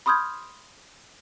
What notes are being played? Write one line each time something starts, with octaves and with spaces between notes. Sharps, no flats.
B5 C6 D#6 F6 G6 G#6